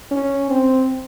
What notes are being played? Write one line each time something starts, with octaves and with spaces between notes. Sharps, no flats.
C#4
C4